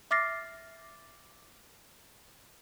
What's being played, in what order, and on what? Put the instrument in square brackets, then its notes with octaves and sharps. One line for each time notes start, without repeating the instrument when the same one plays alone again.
[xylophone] E5 D6 F6 A6 A#6 C7